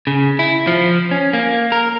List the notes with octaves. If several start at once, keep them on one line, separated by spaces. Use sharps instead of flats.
C#3
E4
F3
C#4
A#3
A#4